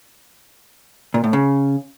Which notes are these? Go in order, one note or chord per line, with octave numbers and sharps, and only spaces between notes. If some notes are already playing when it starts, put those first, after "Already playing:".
A#2
A2
C#3